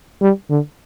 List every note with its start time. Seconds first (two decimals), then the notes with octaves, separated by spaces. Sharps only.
0.21 G3
0.50 D3